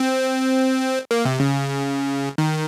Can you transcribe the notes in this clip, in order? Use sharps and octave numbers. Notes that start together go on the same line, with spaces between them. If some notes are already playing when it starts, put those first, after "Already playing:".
Already playing: C4
A#3
C3
C#3
D#3